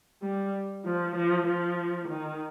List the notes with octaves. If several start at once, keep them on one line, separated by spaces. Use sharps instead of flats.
G3
F3
F3
F3
D#3